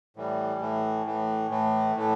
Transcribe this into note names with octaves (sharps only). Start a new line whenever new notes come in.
A2 E3 G3
A2 E3 A3
A2 E3 A3
A2 E3 A3
A2 E3 A3